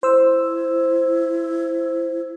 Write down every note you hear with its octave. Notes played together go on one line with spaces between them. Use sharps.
E4 C5 E6